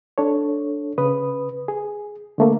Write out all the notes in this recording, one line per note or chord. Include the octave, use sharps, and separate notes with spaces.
D4 A4 C#5
C#3 B4 D#6
G#4
D3 A3 A#3